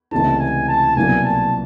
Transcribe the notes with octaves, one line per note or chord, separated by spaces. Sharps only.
C#2 C3 E3 A3 D4 A5
G#5
A5
C2 B2 F#3 A#3 D4 G#5
A5